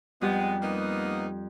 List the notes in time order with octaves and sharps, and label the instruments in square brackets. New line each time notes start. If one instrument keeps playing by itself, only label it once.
[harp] F2 G3 G4 [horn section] G#3 B3
[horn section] A#3 B3 D#4